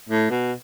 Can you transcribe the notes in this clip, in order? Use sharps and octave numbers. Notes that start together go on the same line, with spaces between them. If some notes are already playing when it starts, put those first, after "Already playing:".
A2
B2